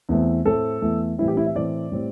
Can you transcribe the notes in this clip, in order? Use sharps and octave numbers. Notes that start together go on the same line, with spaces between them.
E2 E3 A3 C4
A2 A3 C4 A4
E2 E3 A3
A2 E3 G3 C4 E4
G4
E4
E5
A2 E3 A3 C4 D5
A2 G3 C4